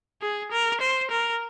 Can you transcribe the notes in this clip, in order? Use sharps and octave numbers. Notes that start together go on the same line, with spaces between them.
G#4
A#4
C5
A#4